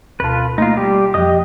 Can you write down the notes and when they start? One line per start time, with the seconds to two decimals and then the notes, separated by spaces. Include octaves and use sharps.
0.20 D2 B2 F4 B4 A5
0.58 A3 A#3 D#4 F4
0.77 G3 G4
1.14 F2 F3 G4 D#5 D#6